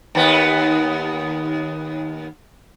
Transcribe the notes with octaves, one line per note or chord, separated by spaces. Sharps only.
D#2 B3